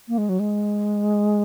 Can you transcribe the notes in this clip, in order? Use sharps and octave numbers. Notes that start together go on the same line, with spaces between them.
A#3
G#3
F#3
G#3